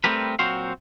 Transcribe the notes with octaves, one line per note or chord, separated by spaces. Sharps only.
G3 A3 C4 G4 A#4 B4
A#2 F#3 C4 F#4 C5 F5